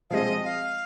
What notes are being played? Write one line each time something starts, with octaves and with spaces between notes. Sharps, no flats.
F3 G#3 C4 D#5 F5
F5